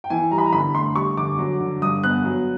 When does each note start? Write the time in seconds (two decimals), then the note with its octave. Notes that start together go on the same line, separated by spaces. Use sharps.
0.04 G5
0.10 E3 G#5
0.31 G3 A#5
0.38 B5
0.46 A#5
0.53 D3 B5
0.74 A3 C6
0.96 G3 C#6
1.17 D3 D6
1.39 F#3
1.60 D3
1.82 G2 D#6
2.04 B3 F#6
2.25 F#3